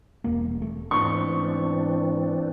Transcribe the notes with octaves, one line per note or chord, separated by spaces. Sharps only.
E1 G3 A#3
A3
G#2 E3 B3 C4 D4 D#4 C#6